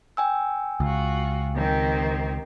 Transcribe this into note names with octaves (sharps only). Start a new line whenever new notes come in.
G5 G#5 E6
C#2 F4 F#4
D#3 C4 G4